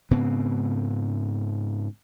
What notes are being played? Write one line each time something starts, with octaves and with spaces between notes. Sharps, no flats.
G#2 C#3 B3 C4